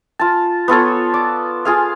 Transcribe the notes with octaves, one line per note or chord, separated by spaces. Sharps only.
F4 A5
B3 F4 A4 C#5
D5
F4 G#4 F5